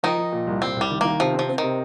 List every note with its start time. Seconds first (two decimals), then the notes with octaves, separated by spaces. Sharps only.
0.03 D#3 F3 D#4
0.18 F3
0.32 A#2
0.47 C2
0.62 C2 C4
0.76 C2 G3
0.90 D#3
1.01 D#3 A#3
1.20 C3 F3
1.34 F3 C4
1.49 C4
1.58 C3 D#3